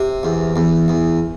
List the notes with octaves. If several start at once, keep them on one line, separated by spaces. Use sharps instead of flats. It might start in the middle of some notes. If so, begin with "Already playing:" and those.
Already playing: C3
E2
E2
E2